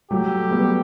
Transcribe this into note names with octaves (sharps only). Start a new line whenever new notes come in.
F#3 A3 G4
G3 B3